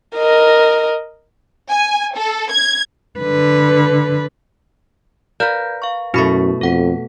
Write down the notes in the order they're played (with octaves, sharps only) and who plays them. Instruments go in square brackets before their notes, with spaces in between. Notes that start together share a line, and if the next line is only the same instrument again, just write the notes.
[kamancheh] A#4 D#5
[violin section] G#5
A4
G#6
[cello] D3 B4
[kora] A#4 B4 [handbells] D5 F5 G6
[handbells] F5 C#6
[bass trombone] F#2 [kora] B2 A3 [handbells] E4 B5 C#6
[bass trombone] F2 [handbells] A4 F#5 B6